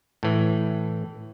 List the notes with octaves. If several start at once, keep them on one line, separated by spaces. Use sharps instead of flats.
A2 E3